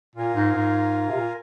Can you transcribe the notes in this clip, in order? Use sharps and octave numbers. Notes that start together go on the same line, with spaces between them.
A#2 F4 A#4 F5 G#5
G#2
G#2
C3
A#2